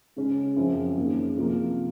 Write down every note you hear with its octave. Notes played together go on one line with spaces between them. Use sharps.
C#3 G#3 C#4
F#2 F3 C4
F#2 D#3 A#3 C#4 G#4
C3 F3 A#3 F4 A#4